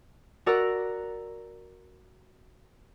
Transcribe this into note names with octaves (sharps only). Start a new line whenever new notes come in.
F#4 A#4 D5 A#5 E6 F#6